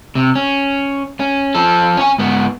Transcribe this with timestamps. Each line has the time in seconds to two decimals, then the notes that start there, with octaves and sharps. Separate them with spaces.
0.15 C3
0.35 C#4
1.20 C#4
1.55 F3 A4
1.97 C#4 G#5
2.18 G#2 B3